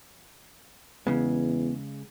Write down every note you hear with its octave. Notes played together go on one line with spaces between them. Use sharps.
E2 C#3 G#3 B3